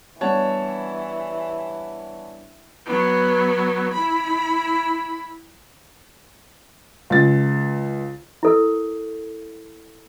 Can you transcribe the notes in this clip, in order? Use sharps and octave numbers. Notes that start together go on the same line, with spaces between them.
E3 G3 B3 D4 C#5 F#5 A5
F#3 B3
E4 B5
C#2 A6
E4 A4 A#4